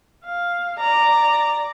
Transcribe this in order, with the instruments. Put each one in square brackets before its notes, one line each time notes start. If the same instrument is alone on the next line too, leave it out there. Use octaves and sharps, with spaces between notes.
[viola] F5
[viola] D5 [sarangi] A#5